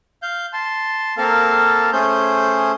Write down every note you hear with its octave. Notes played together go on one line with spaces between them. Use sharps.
F5 G6
A5 C6
A#3 C4 A4 A#4 F5 A5
A3 C#4 G#4 C5 G6